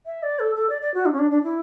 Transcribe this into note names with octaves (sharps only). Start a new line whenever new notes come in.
E5
D5
A4
A4
D5
D5
F#4
D4
C#4
D4
D4
E4